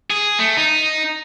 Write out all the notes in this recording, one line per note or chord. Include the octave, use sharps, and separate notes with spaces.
G#4
A3
D#4